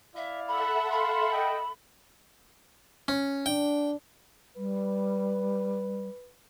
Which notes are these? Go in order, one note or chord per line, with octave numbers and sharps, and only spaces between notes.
E4 D5 E5 F5
A4 E5 F#5 B5
F5 B5 C6
D#5 G5
C#4
D4 G5
G3 B4